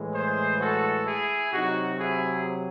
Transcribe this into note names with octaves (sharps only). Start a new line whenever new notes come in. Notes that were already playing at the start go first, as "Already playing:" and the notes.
Already playing: A2 E3 G#3
G#4 C5
F#4 A4
E4 G#4
C3 F#3 D#4 F#4
E4 G#4